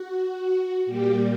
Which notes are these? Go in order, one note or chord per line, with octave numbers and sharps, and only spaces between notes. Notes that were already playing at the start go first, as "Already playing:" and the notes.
Already playing: F#4
A#2 G3 A#3 G4